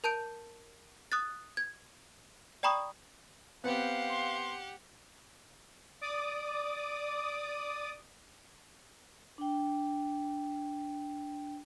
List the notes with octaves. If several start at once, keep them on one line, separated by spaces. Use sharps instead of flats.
A#4 A5 G6 D7
D#6 F#6 A6
G#6
D5 G5 A#5 B5 C#6 D#6
B3 C4 G4 F5 F#5
C6
D5 D6 D#6
D4 G5